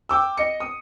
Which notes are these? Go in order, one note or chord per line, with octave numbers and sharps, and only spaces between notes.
G5 D6 E6
D#5 C#7
D#6